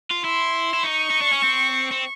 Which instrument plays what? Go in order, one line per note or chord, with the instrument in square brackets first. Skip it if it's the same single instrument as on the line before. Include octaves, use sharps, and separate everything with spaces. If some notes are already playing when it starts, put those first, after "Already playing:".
[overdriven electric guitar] F4
[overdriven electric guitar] E4 [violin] C6
[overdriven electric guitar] E4
[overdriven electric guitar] D#4 [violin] C#6
[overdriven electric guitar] D#4
D4
C#4
C4
C4